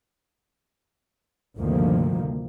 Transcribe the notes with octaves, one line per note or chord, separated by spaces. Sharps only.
D2 G2 C3 D#3 F3 A#3